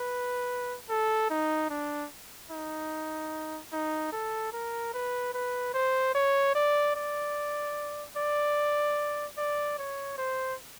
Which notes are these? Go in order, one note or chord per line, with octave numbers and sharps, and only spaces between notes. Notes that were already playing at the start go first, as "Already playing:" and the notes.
Already playing: B4
A4
D#4
D4
D#4
D#4
A4
A#4
B4
B4
C5
C#5
D5
D5
D5
D5
C#5
C5